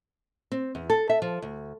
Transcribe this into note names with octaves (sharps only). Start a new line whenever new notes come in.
C4
E2
A4
E5
F3
D2